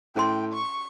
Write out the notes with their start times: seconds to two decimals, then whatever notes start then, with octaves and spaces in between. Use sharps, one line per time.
0.16 A2 C#4 G#4 G5 C6
0.53 C#6